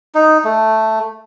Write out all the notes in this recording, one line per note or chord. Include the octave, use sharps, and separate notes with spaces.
D#4
A3